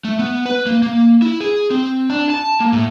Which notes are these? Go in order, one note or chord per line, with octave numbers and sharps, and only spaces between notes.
A3
B3
B4
A#3
A#3
E4
G#4
C4
D4
A5
A#3
A2